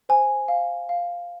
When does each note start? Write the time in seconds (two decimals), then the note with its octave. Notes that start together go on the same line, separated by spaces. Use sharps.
0.09 C5 G#5
0.48 F5
0.89 F5